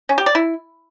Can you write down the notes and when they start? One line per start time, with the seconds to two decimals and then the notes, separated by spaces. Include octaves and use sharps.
0.09 C#4
0.18 G4
0.26 D5
0.35 E4